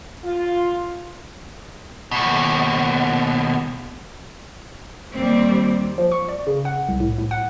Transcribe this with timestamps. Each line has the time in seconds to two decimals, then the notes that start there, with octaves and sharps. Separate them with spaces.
0.24 F4
2.11 D#2 B2
5.14 D#2 G3 C4
5.98 F3
6.12 C#6
6.29 D5
6.47 C#3
6.65 F#5
6.89 C2
7.00 A2
7.18 A2
7.31 F#5